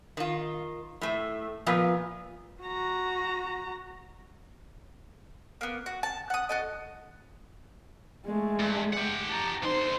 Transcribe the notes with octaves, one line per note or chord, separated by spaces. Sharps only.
D#3 F4
A2 A3
A#2 F3 B3 F4
F#4 A#5
A#3 B3
F#4
A5
F#5 D#6
F#4 A4 D#5
G#3 A3
G2
G4 F#5
A5 A#5
D2 D#4 C5 C6